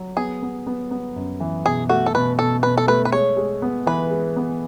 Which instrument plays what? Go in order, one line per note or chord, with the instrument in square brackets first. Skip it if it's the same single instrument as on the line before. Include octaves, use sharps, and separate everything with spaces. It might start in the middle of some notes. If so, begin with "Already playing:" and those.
Already playing: [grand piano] F#3
[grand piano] B3 [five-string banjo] G#4
[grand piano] B3
B3
B3
F#2
E3
[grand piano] B2 [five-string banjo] G#4
[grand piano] A3 [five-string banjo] F#4
[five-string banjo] A4
[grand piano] B2 [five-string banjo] B4
[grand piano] B2 [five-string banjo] A4
[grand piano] B2 [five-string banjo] B4
[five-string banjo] A4
[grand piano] A3 [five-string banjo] B4
[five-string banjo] B4
[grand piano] G#3 [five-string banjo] C#5
[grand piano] G#3
B3
[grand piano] E3 [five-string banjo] B4
[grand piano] G#3
B3